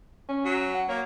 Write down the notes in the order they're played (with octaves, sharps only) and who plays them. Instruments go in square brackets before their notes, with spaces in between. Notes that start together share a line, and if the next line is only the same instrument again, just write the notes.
[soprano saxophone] C#4
[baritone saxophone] F#3
[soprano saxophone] F#5
[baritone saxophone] A#3 [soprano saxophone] C#5